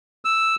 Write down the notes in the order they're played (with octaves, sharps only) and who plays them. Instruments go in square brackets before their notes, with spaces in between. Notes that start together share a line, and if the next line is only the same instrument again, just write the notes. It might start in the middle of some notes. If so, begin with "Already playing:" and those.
[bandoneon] E6